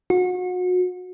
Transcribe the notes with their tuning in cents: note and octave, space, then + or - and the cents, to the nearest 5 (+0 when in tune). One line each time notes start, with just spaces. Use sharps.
F#4 -30